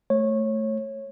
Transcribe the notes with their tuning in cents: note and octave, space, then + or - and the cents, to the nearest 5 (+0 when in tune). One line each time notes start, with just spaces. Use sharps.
A3 +0 C#5 -20